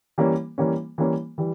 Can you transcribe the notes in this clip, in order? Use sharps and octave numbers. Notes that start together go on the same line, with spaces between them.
E3 G3 A#3 C#4
E3 G3 A#3 C#4
E3 G3 A#3 C#4
E3 G3